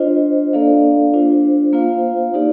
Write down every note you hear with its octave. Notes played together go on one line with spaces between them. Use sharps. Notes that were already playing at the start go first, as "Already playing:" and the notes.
Already playing: D4 F4 C5 D#5
A#3 D4 A4 D5 F5
D4 F4 C5
A#3 F4 C5 F5
D#4 G4 D5